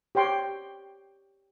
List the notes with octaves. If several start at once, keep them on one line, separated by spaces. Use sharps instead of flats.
G4 C#5 G5 C6